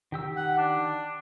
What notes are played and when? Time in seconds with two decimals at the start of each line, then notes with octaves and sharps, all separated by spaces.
0.12 D#3 G4 E6
0.37 F#5
0.58 D4